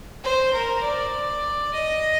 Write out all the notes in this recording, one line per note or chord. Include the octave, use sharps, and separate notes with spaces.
C5
A#4
D5
D#5